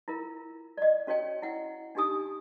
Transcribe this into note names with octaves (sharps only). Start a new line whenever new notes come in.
E4 F4 A#4
D5 D#5
C#4 F#4 C#5 D#5 G5
E4 F#5 G5
D4 D#4 G4 G#5 D#6